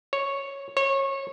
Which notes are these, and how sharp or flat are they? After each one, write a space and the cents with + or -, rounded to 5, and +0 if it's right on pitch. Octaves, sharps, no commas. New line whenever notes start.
C#5 -5
C#5 -25